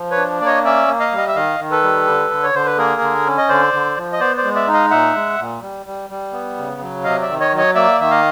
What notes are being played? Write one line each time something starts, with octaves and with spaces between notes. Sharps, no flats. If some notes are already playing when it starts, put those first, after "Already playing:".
Already playing: F3
B4 C#5
D4
A#3 D5
C#5 D#5
C#4 D5 E5
A#3
D#5 F5
G3
D#5
E5
D#3 D#5 F5
D#3
A4 B4
G3
D3
D3
C#5
D3 C5
B4
A#3 G#4 A#4
D3
C#4
D#5
D3 C5 D5
D3
F3
D#5
B3 C5 D5
C5 D5
G#3
D5 E5
D#4
D#5 F5
A#2 E5 F#5
G#3
A#2
G3
G3
G3
B3
C#3
F#3
C3 D#5 F5
D5 E5
D#3
C#5 D#5
F#3
C#5 D#5
A#3 D5 E5
D#3 E5
D#5 F5